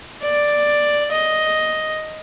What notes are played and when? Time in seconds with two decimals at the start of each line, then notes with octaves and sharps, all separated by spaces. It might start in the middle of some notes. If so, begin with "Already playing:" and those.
0.23 D5
1.12 D#5